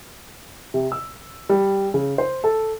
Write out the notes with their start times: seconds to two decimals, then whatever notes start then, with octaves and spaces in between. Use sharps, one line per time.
0.74 C3
0.92 E6
1.49 G3
1.94 C#3
2.18 C5
2.44 A4